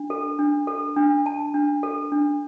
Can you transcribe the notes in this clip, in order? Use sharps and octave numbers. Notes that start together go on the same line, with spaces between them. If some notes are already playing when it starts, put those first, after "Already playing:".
Already playing: D4
A4
D4
A4
D4
A5
D4
A4
D4